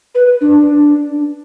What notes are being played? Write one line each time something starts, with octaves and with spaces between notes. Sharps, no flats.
B4
D4